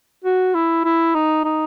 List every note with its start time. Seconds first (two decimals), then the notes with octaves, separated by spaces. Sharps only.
0.24 F#4
0.54 E4
0.85 E4
1.15 D#4
1.44 D#4